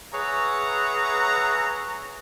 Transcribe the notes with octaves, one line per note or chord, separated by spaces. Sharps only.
G#4 B4 C#5 E5 F#5 A#5